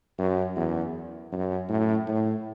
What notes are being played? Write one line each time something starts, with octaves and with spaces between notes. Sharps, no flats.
F#2
E2
F#2
A2
A2